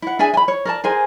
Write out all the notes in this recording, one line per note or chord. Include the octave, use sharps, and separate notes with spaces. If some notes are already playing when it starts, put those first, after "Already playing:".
E4 F#5
D4 G#4 E5 G#5
G#5 B5
C#5
A#4 D5 A5
G#4 A#4 C5 G#5